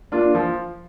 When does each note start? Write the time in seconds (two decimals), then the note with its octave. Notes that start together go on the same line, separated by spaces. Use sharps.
0.12 A#3 D4 F4
0.35 F3